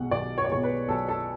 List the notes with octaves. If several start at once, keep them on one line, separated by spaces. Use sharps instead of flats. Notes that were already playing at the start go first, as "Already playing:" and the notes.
Already playing: B1 B2 G#3 F#5
B1 D5
C#5
D5
B2 G#3 C#5
B4
B1 A4
A4